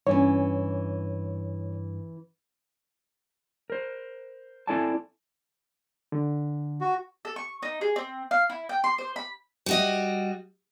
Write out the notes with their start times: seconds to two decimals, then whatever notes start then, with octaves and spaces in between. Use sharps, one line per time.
0.07 G2 E3 C#4 C#5
3.70 A#4 C5
4.67 C4 E4 A4 D5 G#5 A5
6.12 D3
6.81 F#4
7.25 A4
7.36 C#6
7.63 D#4
7.81 G#4
7.96 C4
8.31 F5
8.50 E4
8.69 G5
8.84 C6
8.98 C5
9.16 B5
9.66 G3 F#4 D#5